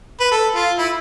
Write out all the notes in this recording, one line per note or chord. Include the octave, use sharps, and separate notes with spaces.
B4
A4
F4
E4